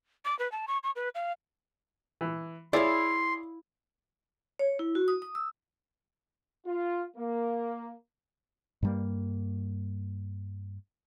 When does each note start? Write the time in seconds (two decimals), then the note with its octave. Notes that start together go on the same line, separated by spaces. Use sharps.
0.25 D6
0.39 B4
0.52 A5
0.68 C#6
0.83 C#6
0.96 B4
1.15 F5
2.21 E3
2.73 E4 G#4 C#5 D5 F5 C6
4.59 C#5
4.79 E4
4.95 F#4
5.08 D#6
5.22 D#6
5.35 E6
6.66 F4
7.17 A#3
8.82 G2 G3 A#3